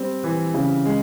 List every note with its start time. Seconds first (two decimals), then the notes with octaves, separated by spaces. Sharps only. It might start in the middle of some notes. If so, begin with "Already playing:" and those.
Already playing: G3 C4
0.24 E3
0.54 C#3
0.86 G#3